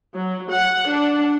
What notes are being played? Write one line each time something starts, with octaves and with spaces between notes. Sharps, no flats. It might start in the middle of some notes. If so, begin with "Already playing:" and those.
F#3
F#5
D4